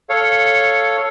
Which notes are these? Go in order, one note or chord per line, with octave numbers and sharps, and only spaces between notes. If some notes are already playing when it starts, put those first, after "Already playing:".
A4 C#5 F5